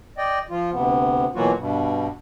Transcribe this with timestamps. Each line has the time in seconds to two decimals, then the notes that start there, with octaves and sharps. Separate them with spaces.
0.18 D5 D#5 G5
0.50 F3 F4
0.72 D2 C3 B3
1.35 B2 E3 F#3 A#3 F4 F#4
1.58 G2 B2